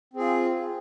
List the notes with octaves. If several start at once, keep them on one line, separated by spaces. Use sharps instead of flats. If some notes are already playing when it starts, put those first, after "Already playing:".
C4 F4 G#4